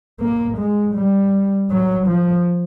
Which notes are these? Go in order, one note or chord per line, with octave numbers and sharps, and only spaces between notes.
A#3
G#3
G3
F#3
F3